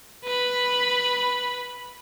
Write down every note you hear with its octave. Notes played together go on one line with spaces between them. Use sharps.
B4 B5